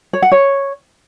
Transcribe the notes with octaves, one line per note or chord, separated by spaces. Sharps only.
C#5
F#5
C#5